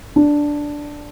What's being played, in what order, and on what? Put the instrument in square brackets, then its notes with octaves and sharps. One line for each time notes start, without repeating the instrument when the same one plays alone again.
[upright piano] D4